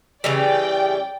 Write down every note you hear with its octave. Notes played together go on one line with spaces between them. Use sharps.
C#3 E3 G3 D5 G5